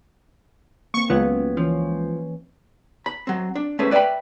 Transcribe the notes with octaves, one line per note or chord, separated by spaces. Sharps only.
A#3 C4 C#6
C#2 F#3 B3 F4
E3 F3 C#4
B5
F#3 C4
D4
A3 C#4 G#4 B4 C5
B4 D5 E5 F#5 G5 B5